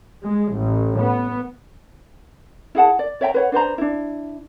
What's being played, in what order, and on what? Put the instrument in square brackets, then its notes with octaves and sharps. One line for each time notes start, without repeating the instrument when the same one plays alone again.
[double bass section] G#3
A1
B3
[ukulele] E4 G#4 F#5 A5
D5
C#5 E5 G5 A#5
B4 C#5 F#5
D4 B4 C5 A#5
D4 E4